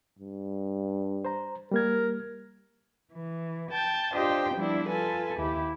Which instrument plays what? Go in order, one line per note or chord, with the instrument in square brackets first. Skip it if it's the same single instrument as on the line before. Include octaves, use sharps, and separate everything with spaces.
[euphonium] G2
[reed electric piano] C5 A#5
[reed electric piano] G3 A#3 G#6 [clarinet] A#4
[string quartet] E3
G5 A5 G6
D4 F4 G4 C5 D#5 G5
F3 G3 B3 D4 E4
F4 A4 B4 G#5
D#2 E4 G4